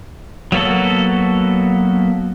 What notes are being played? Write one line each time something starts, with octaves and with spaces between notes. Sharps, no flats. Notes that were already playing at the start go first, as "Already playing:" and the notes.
F#3 A#3 B3 F#4 A4